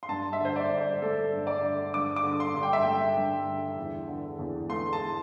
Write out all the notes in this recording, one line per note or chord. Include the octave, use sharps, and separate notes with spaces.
C6
G2 A5
E5
D3 C5
D5
G2
D5
A3 A4
G2
D5
D3
G2 D6
D6
D3
C6
G2
G5
E5
A3 G5
G2
D3
E2
D3
E2
A3 C6
A5